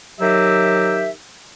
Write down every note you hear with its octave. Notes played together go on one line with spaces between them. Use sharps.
D#3 F#3 G4 E5